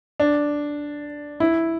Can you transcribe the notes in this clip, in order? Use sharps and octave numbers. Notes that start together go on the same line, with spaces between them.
D4
E4